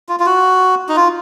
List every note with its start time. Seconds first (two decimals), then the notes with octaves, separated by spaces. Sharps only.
0.09 F4
0.20 F4
0.26 F#4
0.89 D#4
0.96 F4